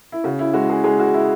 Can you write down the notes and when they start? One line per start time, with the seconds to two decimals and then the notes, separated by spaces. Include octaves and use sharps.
0.12 E4
0.24 C#3 F#4
0.39 E4
0.53 G#3 F#4
0.69 G#4
0.84 G#3 G#4
1.00 F#4
1.14 E4